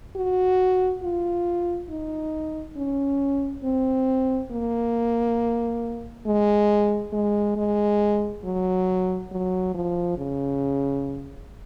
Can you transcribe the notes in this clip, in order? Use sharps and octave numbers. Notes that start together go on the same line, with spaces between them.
F#4
F4
D#4
C#4
C4
A#3
G#3
G#3
G#3
F#3
F#3
F3
C#3